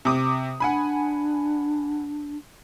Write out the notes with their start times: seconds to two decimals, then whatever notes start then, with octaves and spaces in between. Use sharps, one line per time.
0.05 C3 D6 D#6
0.60 D4 F#5 G#5 B5